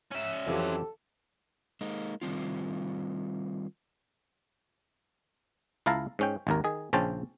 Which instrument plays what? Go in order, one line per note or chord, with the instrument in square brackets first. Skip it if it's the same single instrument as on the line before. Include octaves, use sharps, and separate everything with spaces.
[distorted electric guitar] C#4 E5
[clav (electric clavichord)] F2 E3 F#3 [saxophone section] C4 F4 G4 [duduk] A4
[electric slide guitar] G#3 A#3 D#4
D#3 G3 C4 F4
[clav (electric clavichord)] C#2 E4 F5 A5 A#5
G#2 C#4 G5
G#1 D#2 A#4
D#3 G#4
A#1 C#3 C#4 C5 G5 A5